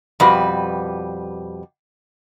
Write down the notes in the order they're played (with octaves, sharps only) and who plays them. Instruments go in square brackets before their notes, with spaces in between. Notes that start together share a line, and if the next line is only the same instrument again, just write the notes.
[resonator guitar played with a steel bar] F2 B2 G3 F#4 B4